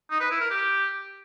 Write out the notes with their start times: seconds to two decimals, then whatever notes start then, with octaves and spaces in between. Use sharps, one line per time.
0.11 D#4
0.20 B4
0.30 E4
0.40 A#4
0.50 G4